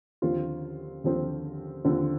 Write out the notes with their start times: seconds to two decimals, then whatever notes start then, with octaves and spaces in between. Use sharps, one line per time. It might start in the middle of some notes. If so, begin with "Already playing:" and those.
0.22 D#2 D3 F3 C4 F4
1.04 D#2 D3 F3 C4 F4
1.84 D#2 D3 F3 C4 F4